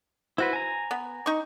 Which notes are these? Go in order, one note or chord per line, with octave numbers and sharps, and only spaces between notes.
E4 F#4 B4 C5
G#5 A#5
B3
D#4 C#6